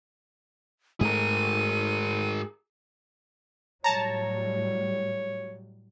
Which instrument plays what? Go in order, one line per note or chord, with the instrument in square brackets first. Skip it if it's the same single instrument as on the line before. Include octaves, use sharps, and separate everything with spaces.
[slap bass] G#2 A3 [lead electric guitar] G#4 A#4 [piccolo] D#7
[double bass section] A2 F#3 G3 [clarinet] C#5 [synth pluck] A5 A#5